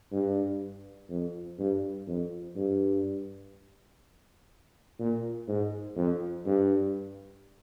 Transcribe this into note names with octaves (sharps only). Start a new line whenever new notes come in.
G2
F2
G2
F2
G2
A#2
G#2
F2
G2